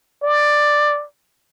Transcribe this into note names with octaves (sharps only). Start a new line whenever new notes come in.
D5